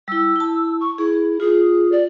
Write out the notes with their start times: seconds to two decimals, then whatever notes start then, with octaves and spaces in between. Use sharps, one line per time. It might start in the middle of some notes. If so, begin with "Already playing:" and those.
0.08 G3 E4 E6
0.36 E4 A5
0.80 C#6
0.98 E4 G#4
1.40 F4 G#4
1.92 D5